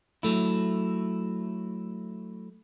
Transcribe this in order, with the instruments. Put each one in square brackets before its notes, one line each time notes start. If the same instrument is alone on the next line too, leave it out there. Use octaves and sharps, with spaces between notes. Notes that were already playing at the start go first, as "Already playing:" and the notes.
[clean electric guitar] F#3 A3 E4